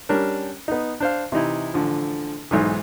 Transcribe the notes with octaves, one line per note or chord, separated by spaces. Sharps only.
G3 C#4 D4 A#4
B3 D#4
D4 C5 F5
C3 E3 D#4 E4
A1 D3 F3
B1 G#2 E3